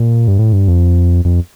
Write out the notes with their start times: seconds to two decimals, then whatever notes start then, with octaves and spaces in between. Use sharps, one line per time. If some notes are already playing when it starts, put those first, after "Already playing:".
Already playing: A#2
0.28 G2
0.39 A2
0.53 G2
0.68 F2
1.25 F2